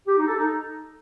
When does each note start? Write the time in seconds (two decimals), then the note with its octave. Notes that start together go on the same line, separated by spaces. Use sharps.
0.07 G4
0.17 D#4
0.28 A4
0.38 D#4